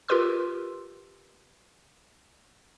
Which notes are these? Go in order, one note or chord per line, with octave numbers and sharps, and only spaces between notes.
F4 G4 A#4 B4 C6 E6